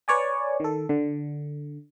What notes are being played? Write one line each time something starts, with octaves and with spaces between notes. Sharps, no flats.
B4 C#5 D5 G#5
D#3 A4
D3